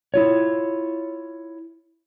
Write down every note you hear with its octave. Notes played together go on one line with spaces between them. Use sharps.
E4 F4 C#5